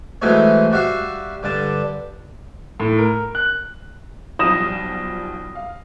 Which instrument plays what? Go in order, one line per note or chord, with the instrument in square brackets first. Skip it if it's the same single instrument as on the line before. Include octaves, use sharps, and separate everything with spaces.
[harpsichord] E3 F#3 G#3 A3 C4 C#4
G3 F#4 E5 F5
G2 D3 A5
[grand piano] A2
A#4
F#6
[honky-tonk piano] B1 F3 G3 [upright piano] D#6 A#6 E7
[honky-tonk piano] F5